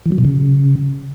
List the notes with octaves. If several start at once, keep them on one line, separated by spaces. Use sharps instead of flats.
E3
F#3
B2
C#3